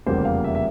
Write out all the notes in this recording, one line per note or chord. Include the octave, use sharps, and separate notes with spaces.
F1 E2 C#3 G3 A#3 C5
F5
E5
E5